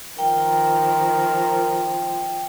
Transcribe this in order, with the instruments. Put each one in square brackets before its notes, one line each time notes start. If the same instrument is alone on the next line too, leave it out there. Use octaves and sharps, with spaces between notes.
[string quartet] D#3 F3 [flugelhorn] A#4 [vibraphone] G5